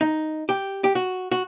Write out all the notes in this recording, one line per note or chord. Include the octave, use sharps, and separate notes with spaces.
D#4
G4
G4
F#4
F#4